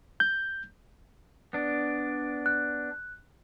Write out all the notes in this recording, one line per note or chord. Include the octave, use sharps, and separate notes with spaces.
G6
B3 D4
F#6